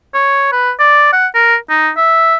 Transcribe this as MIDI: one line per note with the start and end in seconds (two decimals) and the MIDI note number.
0.14 0.48 73
0.52 0.71 71
0.80 1.09 74
1.13 1.27 78
1.35 1.56 70
1.70 1.90 63
1.97 2.37 76